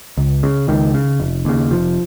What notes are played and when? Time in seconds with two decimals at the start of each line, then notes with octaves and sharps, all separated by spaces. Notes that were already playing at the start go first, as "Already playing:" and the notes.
0.18 C#2
0.43 C#3
0.68 C#2 D#3
0.94 C#3
1.20 F1
1.45 D#2 C#3
1.71 F1 F3